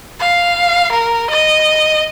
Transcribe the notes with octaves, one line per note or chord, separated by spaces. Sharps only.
F5
A#4
D#5